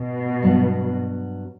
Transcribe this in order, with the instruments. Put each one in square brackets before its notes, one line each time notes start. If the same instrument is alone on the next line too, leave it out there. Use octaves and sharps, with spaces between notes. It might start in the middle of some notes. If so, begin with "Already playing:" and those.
Already playing: [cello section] B2
[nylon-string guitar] G2 F#3 B3